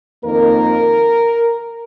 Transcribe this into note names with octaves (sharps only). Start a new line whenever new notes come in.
F2 D#3 A#3 A#4